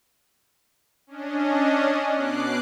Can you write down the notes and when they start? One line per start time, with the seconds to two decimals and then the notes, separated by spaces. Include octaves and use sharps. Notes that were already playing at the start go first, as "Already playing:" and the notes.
1.07 C#4 D4 D#5
2.13 B2 D6 F#6 C7